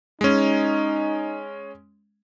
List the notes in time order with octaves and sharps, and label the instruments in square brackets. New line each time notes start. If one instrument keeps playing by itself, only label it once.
[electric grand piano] G#3 C#4 [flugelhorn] D#4